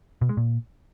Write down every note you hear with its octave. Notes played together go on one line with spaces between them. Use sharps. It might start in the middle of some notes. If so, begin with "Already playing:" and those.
B2
G#3
A#2